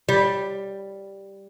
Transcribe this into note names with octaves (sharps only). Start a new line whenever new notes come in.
G3